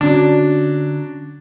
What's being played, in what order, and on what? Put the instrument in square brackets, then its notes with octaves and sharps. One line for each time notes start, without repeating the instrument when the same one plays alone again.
[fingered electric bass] D3 C#4 [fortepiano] F#3 D4